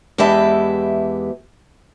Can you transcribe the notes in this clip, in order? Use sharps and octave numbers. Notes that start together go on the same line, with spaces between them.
E2 G#3 G4 B4 E5 A5